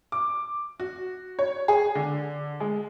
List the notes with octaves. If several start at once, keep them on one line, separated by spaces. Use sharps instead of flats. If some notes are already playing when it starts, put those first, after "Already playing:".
D6
F#4
C#5
G#4
D3
G#3